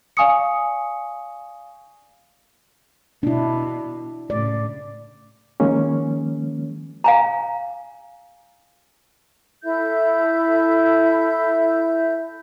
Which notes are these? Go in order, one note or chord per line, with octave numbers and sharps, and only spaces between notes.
D5 F5 G#5 C#6 D#6 C#7
B2 D4 E4
A2 C#3 D5
D#3 F3 G#3 A#3 C#4
F5 G#5 A#5
E4 A4 E5 G6